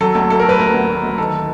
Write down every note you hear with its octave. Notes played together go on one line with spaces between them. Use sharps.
F#3 A4
D2 A4
D2 A4
A#4
F#3 B4
D2 A#4
D2
F#3
D2
D#3 A4